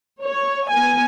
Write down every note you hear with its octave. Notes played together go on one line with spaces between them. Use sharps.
C#5
B3 G#5